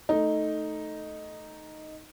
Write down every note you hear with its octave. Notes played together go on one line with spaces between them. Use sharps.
A3 D#4